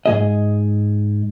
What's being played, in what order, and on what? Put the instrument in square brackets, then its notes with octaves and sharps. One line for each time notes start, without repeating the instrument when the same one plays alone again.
[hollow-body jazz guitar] G#2 D#3 G#4 D#5